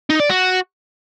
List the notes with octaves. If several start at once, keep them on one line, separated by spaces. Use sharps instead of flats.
D#4
D5
F#4